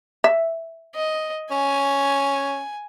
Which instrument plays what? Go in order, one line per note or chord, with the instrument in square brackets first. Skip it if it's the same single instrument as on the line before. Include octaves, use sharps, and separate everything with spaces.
[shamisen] E5
[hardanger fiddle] D#5
[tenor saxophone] C#4 [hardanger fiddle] G#5